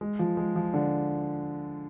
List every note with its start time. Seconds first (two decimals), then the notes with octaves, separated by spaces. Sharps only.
0.01 G#3
0.19 F3
0.37 G#3
0.56 F3
0.74 D3